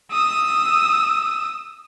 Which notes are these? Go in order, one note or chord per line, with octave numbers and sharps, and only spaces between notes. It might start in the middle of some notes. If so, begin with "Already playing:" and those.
D#6 E6